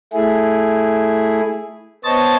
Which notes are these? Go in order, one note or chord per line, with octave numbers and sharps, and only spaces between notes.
A3 E4 G#4
B3 C5 C#5 D#5 A5 A6